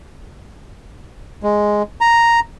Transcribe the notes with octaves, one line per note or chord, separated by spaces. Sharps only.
G#3
A#5